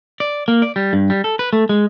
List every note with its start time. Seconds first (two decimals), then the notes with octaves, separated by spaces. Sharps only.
0.20 D5
0.48 A#3
0.62 D5
0.76 G3
0.93 G2
1.10 G3
1.24 A4
1.39 B4
1.53 A3
1.69 G#3